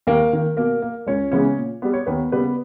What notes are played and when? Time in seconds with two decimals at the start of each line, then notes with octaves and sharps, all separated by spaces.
0.07 D#2 A#3 A#4
0.33 D#3 A#3
0.57 B2 A#3 A#4
0.82 A#3
1.07 C#2 C#4 C#5
1.32 C#3 E3 G#3 B3 C#4 C#5
1.57 A#2
1.82 G3 B3
1.93 C#5
2.06 D#2 B3 B4
2.32 C#3 G3 A#3 B3 B4